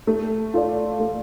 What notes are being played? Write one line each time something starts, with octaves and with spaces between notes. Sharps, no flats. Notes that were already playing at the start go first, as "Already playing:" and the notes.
A3
F4 A4 D5
A3